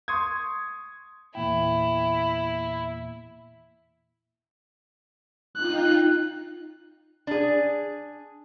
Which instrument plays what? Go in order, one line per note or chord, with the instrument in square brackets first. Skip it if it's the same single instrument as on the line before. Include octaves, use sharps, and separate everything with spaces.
[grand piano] C6 C#6 D#6 G#6
[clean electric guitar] E2 A#2 G5 [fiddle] E4
[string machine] D#4 F4 G5 [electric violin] F#6
[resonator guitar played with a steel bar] D4 G#4